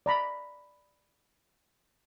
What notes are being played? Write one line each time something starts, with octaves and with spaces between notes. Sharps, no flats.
D5 A#5 B5